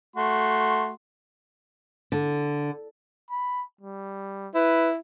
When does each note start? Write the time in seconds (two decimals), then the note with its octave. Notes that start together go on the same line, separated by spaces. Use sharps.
0.16 A3 F#4 C6
2.12 D3
3.31 B5
3.81 G3
4.55 E4 B4